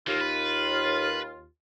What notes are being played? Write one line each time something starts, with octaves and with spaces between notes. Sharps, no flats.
D#2 E3 A#3 F4
B4